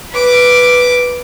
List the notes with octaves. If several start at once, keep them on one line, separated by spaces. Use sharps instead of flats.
B4 D6